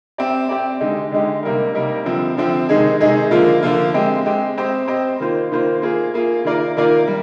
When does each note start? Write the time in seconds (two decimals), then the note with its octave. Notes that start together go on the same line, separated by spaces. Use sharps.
0.18 C4 G4 D5
0.49 C4 G4 D5
0.80 D3 G#3 D#4 G4
1.12 D3 G#3 D#4 G4
1.43 C3 G3 A#3 D#4 A#4
1.75 C3 G3 A#3 D#4 A#4
2.06 D3 F3 C4
2.37 D3 F3 C4
2.69 C3 D#3 G#3 D#4 G#4
3.01 C3 D#3 G#3 D#4 G#4
3.31 D3 F3 A#3 F4
3.63 D3 F3 A#3 F4
3.94 G#3 C4 G4
4.26 G#3 C4 G4
4.58 C4 G4 C5 D#5
4.88 C4 G4 C5 D#5
5.20 D#3 A#3 F4 C5
5.52 D#3 A#3 F4 C5
5.82 A#3 F4 G#4
6.14 A#3 F4 G#4
6.45 D#3 A#3 F4 A#4 D5
6.77 D#3 A#3 F4 A#4 D5
7.07 G3